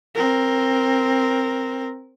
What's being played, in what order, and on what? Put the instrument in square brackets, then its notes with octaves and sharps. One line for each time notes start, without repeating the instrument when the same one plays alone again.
[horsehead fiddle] C4 A#4